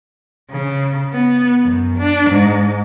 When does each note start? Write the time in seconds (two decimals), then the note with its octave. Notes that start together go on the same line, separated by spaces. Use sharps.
0.51 C#3
1.13 B3
1.63 F#2
1.99 D4
2.30 G#2